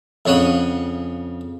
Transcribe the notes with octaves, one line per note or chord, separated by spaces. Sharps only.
F2 C#3 C#5 F#5 D#6